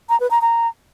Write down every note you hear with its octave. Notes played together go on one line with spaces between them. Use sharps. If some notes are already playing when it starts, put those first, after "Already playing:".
A#5
B4
A#5
A#5